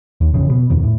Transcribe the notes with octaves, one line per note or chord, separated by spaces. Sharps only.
D#2
A1 F2 C#3
B2
D#1 F2 D#3
A2